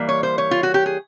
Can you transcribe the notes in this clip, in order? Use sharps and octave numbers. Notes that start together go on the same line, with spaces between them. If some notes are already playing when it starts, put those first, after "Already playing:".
Already playing: E3 G3 A#3
C#5
C5
C#5
F4
F#4
G4
G#4